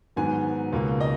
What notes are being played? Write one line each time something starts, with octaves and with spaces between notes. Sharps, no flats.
G#2 D#3 F#3 B3 G#5
C#2 B2 A#3
D#5